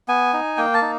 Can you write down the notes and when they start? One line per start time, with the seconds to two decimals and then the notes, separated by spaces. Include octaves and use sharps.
0.08 B3 G#5
0.34 D#4
0.57 A#3 G5
0.74 A5
0.82 D#4